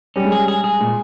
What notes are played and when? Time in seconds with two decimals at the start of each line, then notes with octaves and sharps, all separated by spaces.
0.16 G3 C#4
0.25 G#3
0.32 G3 G#4
0.48 G#4
0.64 G#4
0.80 A#2 G#3